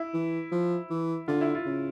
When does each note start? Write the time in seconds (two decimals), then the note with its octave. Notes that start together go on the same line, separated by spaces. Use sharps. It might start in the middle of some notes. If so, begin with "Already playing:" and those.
Already playing: E4
0.14 E3
0.52 F3
0.90 E3
1.28 D3 F4
1.41 E4
1.55 F4
1.66 C#3